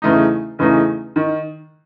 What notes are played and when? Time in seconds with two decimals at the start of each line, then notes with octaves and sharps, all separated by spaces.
0.02 E2 C#3 E3 A3 D#4
0.59 E2 C#3 E3 A3 D#4
1.16 D#3